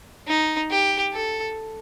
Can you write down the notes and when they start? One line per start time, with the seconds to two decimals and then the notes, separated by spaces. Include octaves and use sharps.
0.28 D#4
0.70 G4
1.13 A4